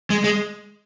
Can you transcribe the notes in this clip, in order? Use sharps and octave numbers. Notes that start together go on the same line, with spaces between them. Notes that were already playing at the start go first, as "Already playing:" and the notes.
G#3
G#3